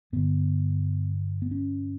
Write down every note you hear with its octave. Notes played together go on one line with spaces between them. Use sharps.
G2 D3 B3
B3
C#4